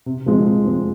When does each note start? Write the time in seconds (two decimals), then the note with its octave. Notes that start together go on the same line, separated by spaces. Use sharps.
0.06 C3
0.26 F3 G#3 C4
0.46 C3
0.65 F3 G#3 C4